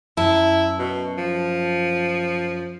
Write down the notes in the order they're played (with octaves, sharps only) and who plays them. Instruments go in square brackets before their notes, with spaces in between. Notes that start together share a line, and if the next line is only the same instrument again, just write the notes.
[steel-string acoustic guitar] F#2 A5 [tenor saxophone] E4
[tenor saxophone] B2
F3